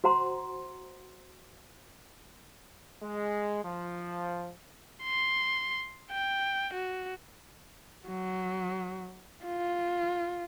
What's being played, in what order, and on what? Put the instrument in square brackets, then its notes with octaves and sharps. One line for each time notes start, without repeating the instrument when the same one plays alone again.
[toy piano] F#4 C5 F#5 A#5 C6
[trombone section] G#3
F3
[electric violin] C6
G5
F#4
[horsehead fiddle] F#3
F4